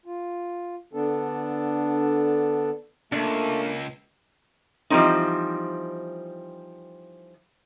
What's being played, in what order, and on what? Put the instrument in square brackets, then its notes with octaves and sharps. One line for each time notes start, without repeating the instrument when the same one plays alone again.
[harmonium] F4
D3 B3 D4 A4
[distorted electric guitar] C#2 [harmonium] A3 [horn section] A#3 [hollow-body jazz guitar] D4
[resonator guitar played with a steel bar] E3 F3 G3 A3 C4 D#4